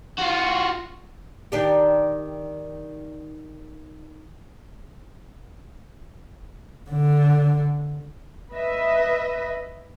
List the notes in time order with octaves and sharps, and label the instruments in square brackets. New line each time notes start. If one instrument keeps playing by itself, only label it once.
[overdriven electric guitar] F4 F#4
[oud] D#3 D4 G4
[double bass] D3
[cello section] B4 D#5 E5